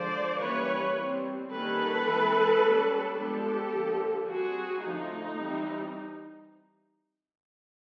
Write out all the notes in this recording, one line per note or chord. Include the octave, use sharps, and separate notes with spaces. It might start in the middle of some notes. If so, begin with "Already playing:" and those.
Already playing: D3 F3 G#3 C5 D5
E3 G3 A#3 C#4 B4 C#5
G3 C4
D#3 G3 A#3 C#4 A4 B4
E3 G#3 C4
G3 A#3 C#4
F3 G#3 B3 D4 G4 A4
D3 F3 A#3
G3 C4 F#4 G#4
D3 F3 A3 D#4
E3 G3 C4